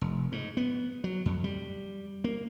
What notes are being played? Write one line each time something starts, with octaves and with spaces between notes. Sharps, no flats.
F1
G#2
B3
F#3
F2
G3
A#3